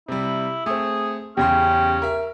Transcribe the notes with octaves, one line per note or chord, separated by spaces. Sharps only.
C3 G3 E4
A3 C4 G#4
E2 C#3 C#4 G4 C6
A#4 E5